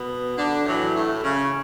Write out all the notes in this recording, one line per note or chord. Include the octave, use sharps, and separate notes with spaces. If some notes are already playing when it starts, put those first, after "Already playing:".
Already playing: B2 B3
D3 D4
A2 E3 F#3
A2 A3
C#3 C#4